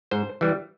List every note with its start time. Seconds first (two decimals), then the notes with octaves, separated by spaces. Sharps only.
0.11 G#2 C5
0.41 E3 G3